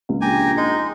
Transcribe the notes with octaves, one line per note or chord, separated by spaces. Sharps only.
C#2
A#1 G4 G5 G#5 A#5
G#3 D#4 D#5